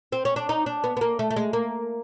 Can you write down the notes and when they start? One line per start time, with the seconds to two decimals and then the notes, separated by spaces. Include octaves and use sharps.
0.12 C4
0.25 C#4
0.36 D4
0.49 D#4
0.66 D4
0.84 B3
0.97 B3
1.01 A#3
1.19 A3
1.30 A3
1.36 G#3
1.53 A#3